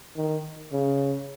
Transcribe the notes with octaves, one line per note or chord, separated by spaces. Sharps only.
D#3
C#3